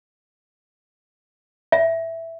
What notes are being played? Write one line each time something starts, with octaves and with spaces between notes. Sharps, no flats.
E5